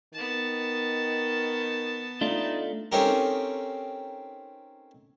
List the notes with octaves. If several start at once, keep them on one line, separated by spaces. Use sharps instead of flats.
D#3 B3 A5
A3 D4 D#4 F4
A3 C4 C#4 D#4 G4 A#4